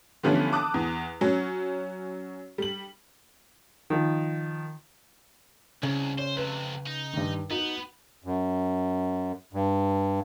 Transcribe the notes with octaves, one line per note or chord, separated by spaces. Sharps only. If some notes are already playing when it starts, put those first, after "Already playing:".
D3 E3 F3 G3 B3 C#4
A5 D6 D#6 F#6
E2
F#3 C#4
G3 F#7
D#3 F3
C2 C#3
C5 C#5
F2 C3 B4
D#4
G2 D#3
B3 D#4 F#4
F#2
G2